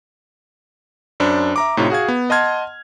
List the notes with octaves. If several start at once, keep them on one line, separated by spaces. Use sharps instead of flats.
F#2 D4 C5 B5
E5 A#5 D6
A2 C3 D#4 F4 C#5
F#4 G#4 F5 G#6
B3
D#5 F#5 A5 C6 F6 G#6